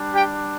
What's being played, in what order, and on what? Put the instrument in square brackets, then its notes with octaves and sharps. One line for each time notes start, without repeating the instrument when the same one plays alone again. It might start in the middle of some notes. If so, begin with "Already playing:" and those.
Already playing: [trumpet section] G3 D4
G4 G5